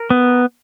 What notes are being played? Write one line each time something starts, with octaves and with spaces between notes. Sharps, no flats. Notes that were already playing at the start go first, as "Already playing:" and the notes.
Already playing: A#4
B3